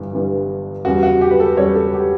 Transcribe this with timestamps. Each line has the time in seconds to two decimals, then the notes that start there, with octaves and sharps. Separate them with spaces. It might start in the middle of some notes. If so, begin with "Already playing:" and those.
Already playing: G1 E3 G3
0.13 G1 G2 E3 G3
0.85 E2 C#3 G3 F#4
1.03 F#4
1.21 G4
1.31 B4
1.40 A4
1.57 E2 C#3 G3 C#5
1.76 A4
1.93 G4